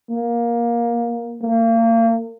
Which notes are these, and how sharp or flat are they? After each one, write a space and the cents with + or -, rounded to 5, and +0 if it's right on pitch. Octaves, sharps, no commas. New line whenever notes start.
A#3 +15
A#3 -35